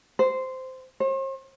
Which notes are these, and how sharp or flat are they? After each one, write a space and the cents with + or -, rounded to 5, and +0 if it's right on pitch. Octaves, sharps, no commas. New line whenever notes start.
C5 -10
C5 +45